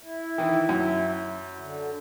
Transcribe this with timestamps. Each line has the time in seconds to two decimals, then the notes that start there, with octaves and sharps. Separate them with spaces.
0.03 E4
0.38 D#3 E3
0.69 F#2
1.59 D3